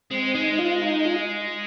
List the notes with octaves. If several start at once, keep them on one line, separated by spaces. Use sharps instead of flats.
G#3 C4
G#3 D#4
F4
D#4
F4